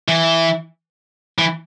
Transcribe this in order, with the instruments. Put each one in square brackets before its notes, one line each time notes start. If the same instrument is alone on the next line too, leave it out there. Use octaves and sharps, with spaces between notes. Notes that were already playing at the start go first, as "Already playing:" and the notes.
[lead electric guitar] E3
E3